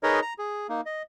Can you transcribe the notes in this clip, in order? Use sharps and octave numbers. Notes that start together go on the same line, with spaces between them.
D#4 G#4 A#4 B4 C#5 D#5
A#5
G#4
A#3 D#4
D#5